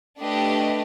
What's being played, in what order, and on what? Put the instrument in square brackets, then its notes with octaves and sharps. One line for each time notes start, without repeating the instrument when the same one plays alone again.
[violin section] A3 D4 G4 B4 D#5